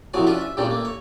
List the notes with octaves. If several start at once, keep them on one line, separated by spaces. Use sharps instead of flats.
A2 C3 F3 F#3 C#5 G#5
C#4 D4 F4 B4 E5
E5
G2 A#2 C#3 G3 C4 D4
A3 A#3
C#5